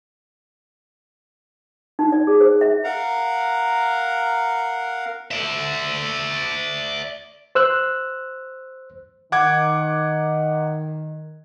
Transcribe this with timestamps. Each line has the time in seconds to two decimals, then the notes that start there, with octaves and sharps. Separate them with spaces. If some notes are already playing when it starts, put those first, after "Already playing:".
1.99 D#4
2.12 D5
2.27 G#4
2.40 C5
2.61 E5
2.84 A#4 F5 F#5 A#5
5.31 D5 E5
7.55 C5 E6 F#6
9.32 D#3 F#5 D6 G#6